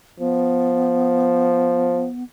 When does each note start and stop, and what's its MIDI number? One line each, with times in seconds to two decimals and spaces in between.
0.20 2.06 53
0.20 2.23 59